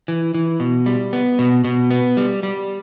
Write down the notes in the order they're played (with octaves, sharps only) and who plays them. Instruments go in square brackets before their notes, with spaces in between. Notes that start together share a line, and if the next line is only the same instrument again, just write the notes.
[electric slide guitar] E3
E3
B2
G3
B3
B2
B2
B3
G3
G3